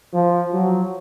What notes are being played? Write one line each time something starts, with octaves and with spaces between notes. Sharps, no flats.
F3
F#3